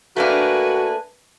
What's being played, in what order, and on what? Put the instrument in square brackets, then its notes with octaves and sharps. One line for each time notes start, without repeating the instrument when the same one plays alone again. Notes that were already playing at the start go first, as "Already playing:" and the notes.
[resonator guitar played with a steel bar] A3 A#3 D4 [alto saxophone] F#4 [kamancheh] B4 G#5